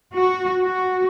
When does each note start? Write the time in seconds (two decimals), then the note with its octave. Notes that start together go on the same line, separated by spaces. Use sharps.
0.13 F#4
0.62 F#4